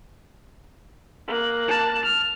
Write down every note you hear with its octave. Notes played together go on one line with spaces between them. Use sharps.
A#3 F#6
A5
F6